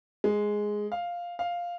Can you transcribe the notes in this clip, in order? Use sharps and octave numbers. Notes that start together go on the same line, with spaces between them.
G#3
F5
F5